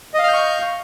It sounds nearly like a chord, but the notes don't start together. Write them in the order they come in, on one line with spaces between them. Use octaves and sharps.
D#5 F5 F6 G6 C#6